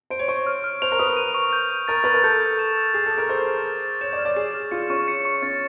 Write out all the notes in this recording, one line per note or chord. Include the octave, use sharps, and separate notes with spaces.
C5 D7
C#5
C5 C#6
F6
F6
C5 F7
A#4
B4 D#6
D#7
C#6
G6
G6
A#4 A6
B4 A6
A#4
A4 G6
G6
E7
E6
G#4 E7
A4
D6
A#4
C5 G6
G6
A6
A6
C#5 E7
D5
F6
D5
G#4 E7
F6
F4 C#7
C#4 C#6
C#7
C#6
C#4 A6